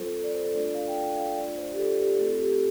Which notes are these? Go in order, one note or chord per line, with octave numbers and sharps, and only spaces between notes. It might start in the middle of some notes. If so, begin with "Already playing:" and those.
Already playing: G3 C4 F4 A4 C5
A4
D5
C5
A4
A3 D4 F4 D5
D5
F5
G5
F5
F5
A3 D4 F4 D5
C5
G4
A4
G4
A3 C4 F4 A4
G4